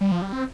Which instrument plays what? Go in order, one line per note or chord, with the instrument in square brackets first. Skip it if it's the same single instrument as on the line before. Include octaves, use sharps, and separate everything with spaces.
[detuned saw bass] G3
F3
G3
C4